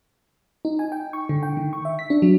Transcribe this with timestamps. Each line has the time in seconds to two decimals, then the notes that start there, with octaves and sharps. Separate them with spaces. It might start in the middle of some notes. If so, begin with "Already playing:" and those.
0.65 D#4
0.79 G#5
0.92 G5
1.13 C#6
1.29 D3
1.43 G5
1.57 D#3
1.73 C#6
1.85 E5
1.99 B6
2.10 D4
2.22 F#3